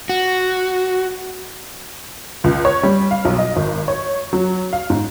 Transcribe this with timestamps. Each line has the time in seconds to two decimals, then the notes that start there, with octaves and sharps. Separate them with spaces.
0.09 F#4
2.44 C#2
2.65 C#5
2.83 G3
3.11 F5
3.25 B1
3.39 D#5
3.56 G#1
3.88 C#5
4.33 F#3
4.73 F5
4.90 G#2